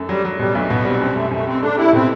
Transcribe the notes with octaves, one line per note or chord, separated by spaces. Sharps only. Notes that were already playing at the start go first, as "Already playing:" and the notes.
Already playing: F#2 A3
F#3 G3
F#3
B2 G3
B1 A3
B2 B3
G3 C4
F#2 C4
F#2 A3
F#2 A3
F#2 C4
A3 D4
E4 G4
B2 C4